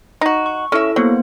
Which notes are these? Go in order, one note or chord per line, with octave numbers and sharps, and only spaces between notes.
D#4 F#4
C#6
C#4 E4 A4 E5
F#3 A#3 B3 C5